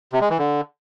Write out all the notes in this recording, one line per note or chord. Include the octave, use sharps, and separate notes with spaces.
C3
G#3
E3
D3